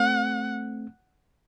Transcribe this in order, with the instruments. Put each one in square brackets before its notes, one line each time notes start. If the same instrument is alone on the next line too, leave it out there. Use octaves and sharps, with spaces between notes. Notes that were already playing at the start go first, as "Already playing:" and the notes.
Already playing: [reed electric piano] A3 C4 [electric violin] F#5